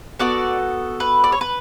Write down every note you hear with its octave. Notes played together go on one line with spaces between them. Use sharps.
B3 F#4 A4 D5
B4
D5
C#5
B4